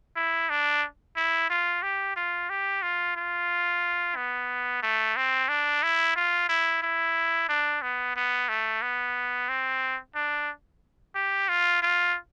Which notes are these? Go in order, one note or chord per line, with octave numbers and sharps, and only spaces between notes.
E4
D4
E4
F4
G4
F4
G4
F4
F4
B3
A3
C4
D4
E4
F4
E4
E4
D4
B3
B3
A3
B3
C4
D4
G4
F4
F4